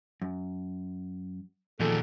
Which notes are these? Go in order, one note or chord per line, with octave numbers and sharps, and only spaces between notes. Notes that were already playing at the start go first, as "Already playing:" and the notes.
F#2
E2 A#2 D#3 F3 G#4 A4